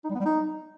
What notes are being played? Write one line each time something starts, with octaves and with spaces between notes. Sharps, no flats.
D#4
G3
B3
G3
D#4